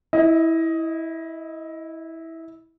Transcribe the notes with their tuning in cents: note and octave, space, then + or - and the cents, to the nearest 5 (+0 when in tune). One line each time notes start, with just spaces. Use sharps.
E4 -15 D#5 +15